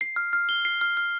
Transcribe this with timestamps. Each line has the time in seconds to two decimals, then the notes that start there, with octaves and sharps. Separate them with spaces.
0.01 C7
0.16 F6
0.33 F6
0.49 G7
0.65 C7
0.81 F6
0.97 F6